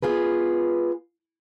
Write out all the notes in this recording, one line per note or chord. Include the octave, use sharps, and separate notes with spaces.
B3 F4 G#4 B4